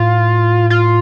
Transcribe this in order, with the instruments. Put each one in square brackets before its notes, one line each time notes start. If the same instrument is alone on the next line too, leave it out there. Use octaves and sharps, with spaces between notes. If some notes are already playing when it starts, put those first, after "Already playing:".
Already playing: [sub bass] A2 [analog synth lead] F4
[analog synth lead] F4